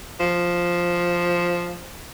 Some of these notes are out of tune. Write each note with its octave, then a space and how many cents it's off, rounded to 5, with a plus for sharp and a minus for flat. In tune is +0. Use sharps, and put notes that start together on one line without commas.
F3 +0